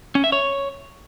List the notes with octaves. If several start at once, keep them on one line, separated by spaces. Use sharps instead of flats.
C#4
E5
C#5